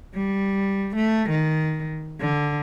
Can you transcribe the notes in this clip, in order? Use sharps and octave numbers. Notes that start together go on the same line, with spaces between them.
G3
A3
D#3
D3